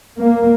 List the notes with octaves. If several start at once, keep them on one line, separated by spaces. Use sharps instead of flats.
A#3